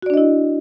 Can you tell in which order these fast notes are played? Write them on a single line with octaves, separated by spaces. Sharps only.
F#4 D5 D4 D#5 E4